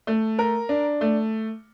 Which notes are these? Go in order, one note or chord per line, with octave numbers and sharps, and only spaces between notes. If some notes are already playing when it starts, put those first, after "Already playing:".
A3
A#4
D4
A3